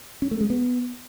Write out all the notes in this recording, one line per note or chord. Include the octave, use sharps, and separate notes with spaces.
C#4
A3
G#3
B3